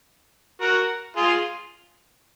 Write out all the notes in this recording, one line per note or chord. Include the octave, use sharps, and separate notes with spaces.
F#4 A#4
F4 G#4